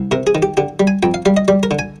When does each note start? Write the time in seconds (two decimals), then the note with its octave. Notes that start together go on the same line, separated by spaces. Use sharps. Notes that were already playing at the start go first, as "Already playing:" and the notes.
Already playing: C2
0.11 C3 A#4
0.27 G#4
0.35 D#3
0.42 G4
0.57 D3 G4
0.80 G3
0.87 G#5
1.03 F2 G5
1.14 F5
1.25 G3 F5
1.37 D#5
1.48 G3 D5
1.63 A#4
1.71 D3
1.79 G#5